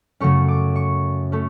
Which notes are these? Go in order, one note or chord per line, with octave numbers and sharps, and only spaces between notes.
F#2 C#3 F#3 A3 C#4 C#6
D6
C#6
A3 C#4